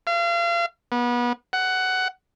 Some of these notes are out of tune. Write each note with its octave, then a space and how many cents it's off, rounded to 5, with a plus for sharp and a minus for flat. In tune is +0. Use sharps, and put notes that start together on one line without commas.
F5 -35
B3 -30
F#5 +10